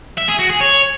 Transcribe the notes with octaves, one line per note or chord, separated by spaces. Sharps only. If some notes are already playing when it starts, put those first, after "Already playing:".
E5
G#4
F#4
G#4
C#5